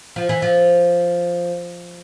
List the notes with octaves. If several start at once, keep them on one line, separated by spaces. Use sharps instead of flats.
F3
E3
F3